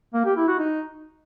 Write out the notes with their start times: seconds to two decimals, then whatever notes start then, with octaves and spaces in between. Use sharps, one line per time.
0.14 A#3
0.25 G4
0.36 E4
0.48 F#4
0.59 D#4